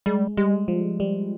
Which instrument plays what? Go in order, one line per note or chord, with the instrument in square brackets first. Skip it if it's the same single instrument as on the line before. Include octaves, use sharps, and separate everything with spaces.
[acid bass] G3 [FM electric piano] G#3
[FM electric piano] G3 [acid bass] G#3
[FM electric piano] F3
G3